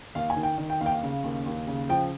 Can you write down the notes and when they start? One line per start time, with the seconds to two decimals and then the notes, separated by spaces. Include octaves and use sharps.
0.15 D#2 F5
0.30 G#5
0.36 D#3
0.43 G5
0.58 D#3
0.70 G5
0.81 D#2 F5
0.86 G5
0.92 F5
1.03 C#3
1.24 D#2
1.46 D#2
1.67 C#3
1.89 F3 G5